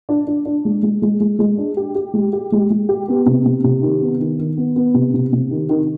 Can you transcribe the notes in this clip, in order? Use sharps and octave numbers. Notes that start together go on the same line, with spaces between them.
D4
D4
D4
G#3
G#3
G#3
G#3
G#3
D4
G4
G4
G#3
G4
G#3
G#3
G4
B3
C3
C3
C3
D#3
B3
D#3
D#3
B3
B3
C3
C3
C3
D#3
D#3